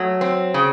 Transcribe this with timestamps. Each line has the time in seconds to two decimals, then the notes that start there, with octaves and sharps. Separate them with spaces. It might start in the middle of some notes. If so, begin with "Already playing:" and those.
Already playing: F#3 A3
0.21 C4
0.54 C#3